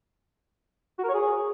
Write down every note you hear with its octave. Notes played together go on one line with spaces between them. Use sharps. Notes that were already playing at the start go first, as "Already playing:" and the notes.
F#4
A#4
C#5
G#4